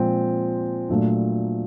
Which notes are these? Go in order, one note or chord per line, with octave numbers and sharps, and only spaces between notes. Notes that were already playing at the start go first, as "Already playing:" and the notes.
Already playing: A#2 F3 G#3 C4 G5
A#2 F#3 A3 D4